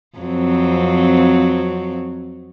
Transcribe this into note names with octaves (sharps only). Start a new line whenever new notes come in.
F2 F#3 C4